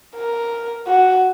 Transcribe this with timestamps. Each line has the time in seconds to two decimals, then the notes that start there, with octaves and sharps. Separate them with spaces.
0.15 A#4
0.87 F#4